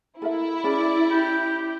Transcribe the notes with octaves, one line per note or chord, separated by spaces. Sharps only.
E4 A4 A#4 E5
C#4 G#4 D5 B5
G4